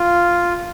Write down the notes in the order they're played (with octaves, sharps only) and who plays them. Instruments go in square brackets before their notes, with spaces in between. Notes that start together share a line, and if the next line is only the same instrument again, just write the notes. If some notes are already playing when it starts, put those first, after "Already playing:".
Already playing: [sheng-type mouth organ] F4